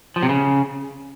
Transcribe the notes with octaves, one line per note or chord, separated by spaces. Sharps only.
F3
C3
C#3